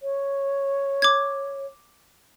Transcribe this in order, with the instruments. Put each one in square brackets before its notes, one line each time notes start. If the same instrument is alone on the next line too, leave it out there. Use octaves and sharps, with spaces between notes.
[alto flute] C#5
[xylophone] D6 G#6